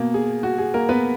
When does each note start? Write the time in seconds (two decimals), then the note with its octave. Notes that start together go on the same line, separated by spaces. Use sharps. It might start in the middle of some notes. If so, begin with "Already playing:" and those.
Already playing: B2 A#3
0.14 G#4
0.43 F#4
0.58 G#4
0.74 A#3 A#4
0.89 B3 B4